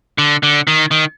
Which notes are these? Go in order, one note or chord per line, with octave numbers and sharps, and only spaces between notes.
D3
D3
D#3
D#3